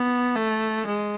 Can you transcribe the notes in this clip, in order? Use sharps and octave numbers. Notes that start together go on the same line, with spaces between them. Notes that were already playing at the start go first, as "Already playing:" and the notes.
Already playing: B3
A3
G#3